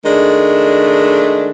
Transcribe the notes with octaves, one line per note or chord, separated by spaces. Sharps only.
D#3 G#3 A3 D4